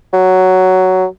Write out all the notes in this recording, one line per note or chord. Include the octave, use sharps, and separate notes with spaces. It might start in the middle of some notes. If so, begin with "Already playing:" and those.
F#3